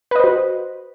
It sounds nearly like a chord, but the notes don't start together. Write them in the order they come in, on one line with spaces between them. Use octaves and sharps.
B4 D#5 C5 F#4